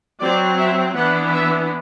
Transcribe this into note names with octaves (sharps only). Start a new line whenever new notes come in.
F#3 C4 D5
E5
E3 B3 D4 F#5
E5